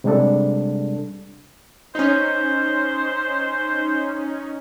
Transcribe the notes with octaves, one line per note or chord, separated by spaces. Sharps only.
C3 G3 G#3 D4 A4
C#4 D#4 C5